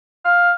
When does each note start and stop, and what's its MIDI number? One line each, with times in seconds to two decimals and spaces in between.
0.25 0.51 77